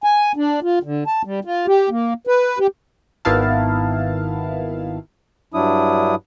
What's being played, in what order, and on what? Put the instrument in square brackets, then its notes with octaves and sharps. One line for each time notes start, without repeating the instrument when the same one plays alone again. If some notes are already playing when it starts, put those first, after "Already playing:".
[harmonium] G#5
D4
F4
D3
A5
G3
F4
G4
A#3
B4
G4
[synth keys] G#1 D#3 B3 E4 F5 A5
[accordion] G2 F#3 D4 E4 D#6